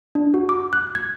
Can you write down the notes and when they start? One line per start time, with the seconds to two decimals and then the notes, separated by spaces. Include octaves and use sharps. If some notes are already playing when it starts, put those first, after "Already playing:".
0.15 D4
0.34 F#4
0.49 D6
0.73 F#6
0.95 G#6